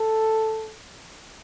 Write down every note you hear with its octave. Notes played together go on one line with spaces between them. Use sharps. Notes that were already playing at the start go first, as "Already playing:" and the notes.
Already playing: A4